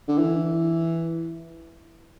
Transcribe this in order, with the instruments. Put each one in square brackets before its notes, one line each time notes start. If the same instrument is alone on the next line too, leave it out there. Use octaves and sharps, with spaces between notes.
[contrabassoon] D3
E3